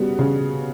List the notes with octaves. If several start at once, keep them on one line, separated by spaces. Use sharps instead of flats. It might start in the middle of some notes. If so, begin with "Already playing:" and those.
Already playing: C#3 G3 B3 F#4
C#3